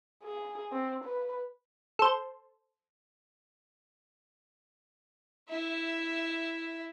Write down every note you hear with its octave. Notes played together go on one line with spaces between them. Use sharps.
G#4
C4
B4
A4 C5
E4 E5